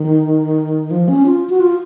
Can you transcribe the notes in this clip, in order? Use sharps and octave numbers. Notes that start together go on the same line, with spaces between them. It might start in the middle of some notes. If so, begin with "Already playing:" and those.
Already playing: D#3
F3
C#4
F4
F#4
F4